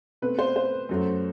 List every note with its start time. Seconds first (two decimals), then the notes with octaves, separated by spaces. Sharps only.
0.22 B2 A3 C4 B4
0.39 C5
0.56 C5
0.89 F#2 F#3 A3